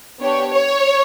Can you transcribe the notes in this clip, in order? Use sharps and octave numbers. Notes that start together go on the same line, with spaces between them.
B3 D4 G4 C#5
C#5